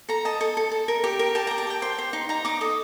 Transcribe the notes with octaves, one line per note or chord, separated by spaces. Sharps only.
A4 A#5
D#5 A5
A4
A4
A4
A#4
G4
A#4
G4 A5
G4 A#5
A5
G4 G5
C5 G5
C5
D#4
D#4 A#5
D#4 D6
A4 D#6